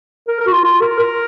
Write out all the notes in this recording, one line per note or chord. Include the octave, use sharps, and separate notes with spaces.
A#4
A#4
F#4
F4
F4
A#4
A#4